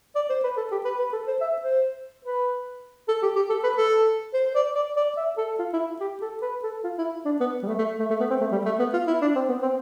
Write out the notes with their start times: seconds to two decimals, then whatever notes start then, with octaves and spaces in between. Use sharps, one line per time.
0.16 D5
0.29 C5
0.44 B4
0.57 A4
0.72 G4
0.85 B4
0.99 B4
1.13 A4
1.27 C5
1.41 E5
1.62 C5
2.25 B4
3.08 A4
3.22 G4
3.36 G4
3.50 A4
3.64 B4
3.78 A4
4.34 C5
4.45 C5
4.55 D5
4.75 D5
4.96 D5
5.17 E5
5.38 A4
5.59 F4
5.73 E4
6.01 G4
6.22 A4
6.42 B4
6.64 A4
6.84 F4
6.98 E4
7.25 D4
7.40 B3
7.63 G3
7.68 A3
7.78 A3
8.00 A3
8.10 A3
8.20 B3
8.30 C4
8.41 A3
8.52 G3
8.66 A3
8.79 B3
8.94 F4
9.07 E4
9.22 D4
9.35 C4
9.49 B3
9.63 C4